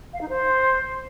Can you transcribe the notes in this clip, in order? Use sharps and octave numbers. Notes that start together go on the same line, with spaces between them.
F5
D#4
C5